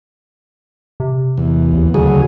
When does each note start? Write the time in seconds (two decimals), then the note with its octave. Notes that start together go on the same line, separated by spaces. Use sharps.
1.00 C3
1.38 E2
1.73 D#2
1.94 D2 C#3 F#3 G#4